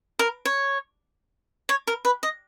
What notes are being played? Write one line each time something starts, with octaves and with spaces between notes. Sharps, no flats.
A#4
C#5
C#5
A#4
B4
D#5